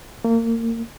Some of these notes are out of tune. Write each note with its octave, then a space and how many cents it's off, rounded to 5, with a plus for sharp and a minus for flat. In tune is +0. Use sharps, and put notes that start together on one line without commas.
A#3 -30